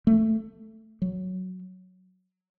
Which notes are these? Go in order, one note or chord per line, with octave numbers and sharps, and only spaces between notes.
A3
F#3